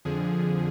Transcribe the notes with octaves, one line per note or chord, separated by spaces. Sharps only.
F2 D3 F3 G#4